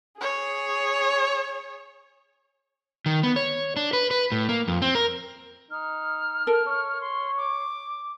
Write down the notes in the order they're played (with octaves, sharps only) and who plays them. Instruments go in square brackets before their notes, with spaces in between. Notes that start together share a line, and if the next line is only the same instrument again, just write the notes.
[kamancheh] G#4 C#5
[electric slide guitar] D#3
B3
C#5
D4
B4
B4
A2
A#3
F2
C4
A#4
[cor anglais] D#4 [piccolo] F6
[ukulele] A4 A#4
[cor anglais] C#5
[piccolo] C6
D6